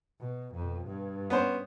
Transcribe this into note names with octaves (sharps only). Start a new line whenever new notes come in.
B2
F2 B2
G2
B3 C#4 C5